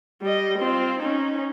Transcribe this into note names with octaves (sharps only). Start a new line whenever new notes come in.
G3 D#5
C4 F4
C#4 D#4